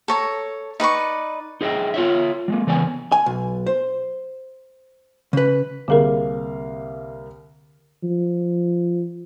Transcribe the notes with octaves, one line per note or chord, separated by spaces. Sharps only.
A4 C#5 A#5
D#4 B4 D5 C#6
D#4 G#4 D#5 E5 G5
F4 C#5 E5
G3 G#3 A#3
C#3 E3 B3 D5 G#5
G#5
B1
C5
C#3 B4
C2 D3 A#3 G#4 A#4 F5
F3